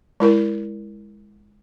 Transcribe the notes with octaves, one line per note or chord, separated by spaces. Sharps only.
G#3 E4 A#4